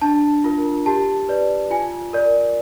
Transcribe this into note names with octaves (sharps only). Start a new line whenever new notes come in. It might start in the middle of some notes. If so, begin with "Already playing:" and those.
D4 A5
F4 A#4
G4 A5
B4 D5
F4 G#5
A#4 D5